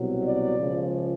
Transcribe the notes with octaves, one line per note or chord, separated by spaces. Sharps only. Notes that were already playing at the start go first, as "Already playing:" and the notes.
Already playing: C2 B2 F#3
D5
C#2 C#3 F3